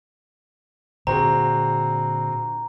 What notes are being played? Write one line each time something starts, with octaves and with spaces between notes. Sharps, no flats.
A#2 D3 C4 F#4 G#4 A#5